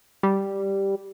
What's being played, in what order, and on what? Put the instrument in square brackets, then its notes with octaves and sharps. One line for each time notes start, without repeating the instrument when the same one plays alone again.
[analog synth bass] G3